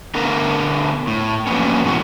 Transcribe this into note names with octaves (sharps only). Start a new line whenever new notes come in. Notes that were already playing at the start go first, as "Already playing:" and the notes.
D3 A3 B3 A#4
A2
F3 F#3 A#3 B3 C#4
G#2 B2 D#3 E3 F#4